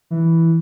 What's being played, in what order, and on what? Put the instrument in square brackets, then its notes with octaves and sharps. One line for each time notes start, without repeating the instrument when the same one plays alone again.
[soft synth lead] E3